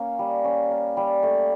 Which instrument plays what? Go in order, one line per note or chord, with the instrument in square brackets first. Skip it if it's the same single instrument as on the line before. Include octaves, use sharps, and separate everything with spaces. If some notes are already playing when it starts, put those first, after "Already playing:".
Already playing: [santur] A#3 C#4
G3
C#4
A#3
G3
A3